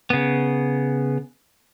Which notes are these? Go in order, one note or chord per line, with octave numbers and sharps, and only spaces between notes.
C#3 B3